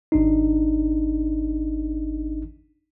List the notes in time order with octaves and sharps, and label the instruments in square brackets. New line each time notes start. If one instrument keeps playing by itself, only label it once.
[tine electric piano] G#1 D4 D#4